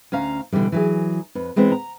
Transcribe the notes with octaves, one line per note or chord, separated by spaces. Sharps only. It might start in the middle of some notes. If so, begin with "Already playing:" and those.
D2 C#4 F5 A#5
B2 D3 E3 G3 G#3
E3 F#3 G#4
F2 B4
E3 G#3 B3 C4
A#5